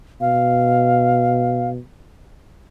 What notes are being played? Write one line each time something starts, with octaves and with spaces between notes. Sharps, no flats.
B2 F5